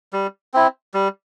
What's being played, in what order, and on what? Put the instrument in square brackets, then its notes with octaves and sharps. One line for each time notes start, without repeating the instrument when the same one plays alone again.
[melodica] G3
C4 E4
G3